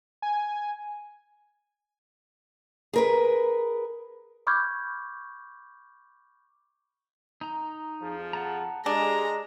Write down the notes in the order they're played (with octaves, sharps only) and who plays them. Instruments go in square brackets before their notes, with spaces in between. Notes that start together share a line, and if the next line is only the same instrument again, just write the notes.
[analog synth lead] G#5
[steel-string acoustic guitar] G#4 A#4 B4
[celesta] B5 C#6 D6 F6 G6 G#6
[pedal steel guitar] D#4 A#5
[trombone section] F2 F3 G#4
[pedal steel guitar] F#5 A5 A#5
[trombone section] G#3 [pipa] D4 [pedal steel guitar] G4 A4 G#5 [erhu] A#5